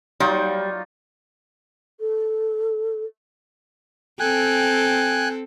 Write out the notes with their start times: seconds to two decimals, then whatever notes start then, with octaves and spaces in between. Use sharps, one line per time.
0.20 F#3 G3 D#4 F4
2.00 A4
4.20 C4 A4 G5 G#5 F#6